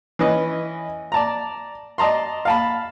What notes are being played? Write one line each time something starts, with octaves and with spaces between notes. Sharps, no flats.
E3 C#4 B4 D#5
D5 A5 A#5
D5 D#5 A5 A#5 C6
F5 A5 B5